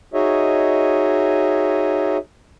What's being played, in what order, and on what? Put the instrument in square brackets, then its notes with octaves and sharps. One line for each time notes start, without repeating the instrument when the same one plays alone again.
[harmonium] D#4 F#4 G#4 C#5 D#5 E5